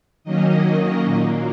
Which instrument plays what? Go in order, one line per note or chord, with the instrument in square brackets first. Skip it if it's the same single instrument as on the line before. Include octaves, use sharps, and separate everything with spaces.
[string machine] D#3 F#3 A#3 C#4 D#5
A#2 F#3 A#3